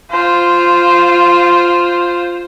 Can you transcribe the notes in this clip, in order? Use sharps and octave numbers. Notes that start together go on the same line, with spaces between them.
F4 C5